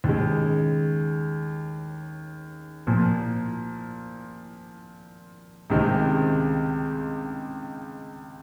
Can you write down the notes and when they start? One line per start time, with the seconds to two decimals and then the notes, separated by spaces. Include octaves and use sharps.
0.04 D#2 C#3 G#3
2.87 A#2 F3 A#3
5.70 C#2 C3 D#3 G#3 C4